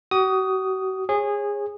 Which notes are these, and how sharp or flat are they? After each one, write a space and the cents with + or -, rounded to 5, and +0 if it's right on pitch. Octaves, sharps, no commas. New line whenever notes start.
F#4 +40 D#6 +0
G#4 -20 C#5 -25